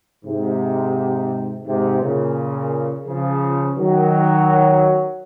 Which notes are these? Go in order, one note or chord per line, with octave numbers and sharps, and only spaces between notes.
G#2 C3
G#2 C3
A#2 C#3
C#3 F3
D#3 F#3